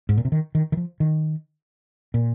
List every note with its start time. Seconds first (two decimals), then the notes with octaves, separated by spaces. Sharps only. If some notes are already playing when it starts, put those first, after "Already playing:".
0.09 G#2
0.17 A#2
0.25 C3
0.32 D#3
0.55 D#3
0.72 D#3
0.77 F3
1.00 D#3
2.14 A#2